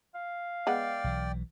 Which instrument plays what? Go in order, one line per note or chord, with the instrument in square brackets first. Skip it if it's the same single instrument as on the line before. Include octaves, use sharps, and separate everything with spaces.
[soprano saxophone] F5
[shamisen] G#3 B3 F#5 [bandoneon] D5 G5
[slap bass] B1 E3